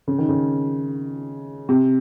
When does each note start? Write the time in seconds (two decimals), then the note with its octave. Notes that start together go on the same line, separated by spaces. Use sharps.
0.08 C#3
0.18 D#3
0.29 C#3
1.69 C3